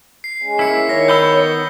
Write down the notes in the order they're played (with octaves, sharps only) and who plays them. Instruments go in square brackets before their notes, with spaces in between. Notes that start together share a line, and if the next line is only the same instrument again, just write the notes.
[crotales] C7
[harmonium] G#3 C#4
[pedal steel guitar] A#3 E4 [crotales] B6 C#7
[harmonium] D#3 [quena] C#5 [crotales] A#6
[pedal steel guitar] B3 B5 E6 [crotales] G6 G7